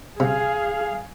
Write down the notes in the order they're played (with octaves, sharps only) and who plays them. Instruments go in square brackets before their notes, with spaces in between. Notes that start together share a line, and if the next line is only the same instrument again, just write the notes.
[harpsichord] C3 [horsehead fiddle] G#4 [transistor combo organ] F5